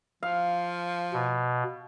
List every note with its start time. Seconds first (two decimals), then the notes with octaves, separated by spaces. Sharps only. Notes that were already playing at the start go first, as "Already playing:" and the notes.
0.23 F3 F5
1.13 B2